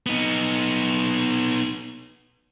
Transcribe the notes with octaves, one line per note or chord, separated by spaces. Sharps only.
B3 D#4